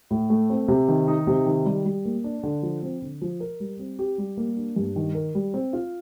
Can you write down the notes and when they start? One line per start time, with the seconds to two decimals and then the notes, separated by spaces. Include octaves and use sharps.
0.11 A2
0.30 A3
0.50 C4
0.68 C3
0.88 D#3
1.08 D#4
1.27 C3
1.46 D#3
1.65 G3
1.85 G3
2.05 A#3
2.24 D4
2.43 D3
2.63 F3
2.83 C4
3.02 D3
3.21 F3
3.40 A#4
3.60 G3
3.79 C4
3.99 G4
4.18 G3
4.37 A#3
4.57 D4
4.76 G2
4.96 D#3
5.15 A#4
5.35 G3
5.54 C4
5.73 F4